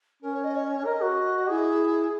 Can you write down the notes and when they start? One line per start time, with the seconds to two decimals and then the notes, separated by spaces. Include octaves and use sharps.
0.22 C#4 A#4
0.33 C#5
0.44 D#5
0.55 C#5
0.86 A#4 D#5
1.01 F#4
1.49 E4 G#4